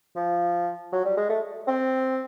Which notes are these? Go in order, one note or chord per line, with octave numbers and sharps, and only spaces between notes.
F3
F#3
G3
G#3
A3
C4